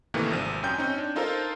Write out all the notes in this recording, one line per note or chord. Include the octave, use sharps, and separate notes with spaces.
A2 C3 D#3 E3 A3 A#3
G#1 C3 F3 D#7
F#2 C#4 G5 G6
C4 C#4 D#4
D4
D#4 F4 A4 A#4 C5 F5